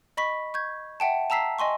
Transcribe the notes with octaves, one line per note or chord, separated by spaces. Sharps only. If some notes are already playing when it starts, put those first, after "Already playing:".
D#5 B5 C#6 B6
C#6 G6 G#6
E5 F#5 G5 A5
A5 A#5 E6 B6 C7
D#5 G#5 C6 C#6